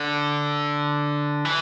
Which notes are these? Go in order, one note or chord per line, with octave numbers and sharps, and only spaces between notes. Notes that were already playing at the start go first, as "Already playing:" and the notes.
Already playing: D3
E3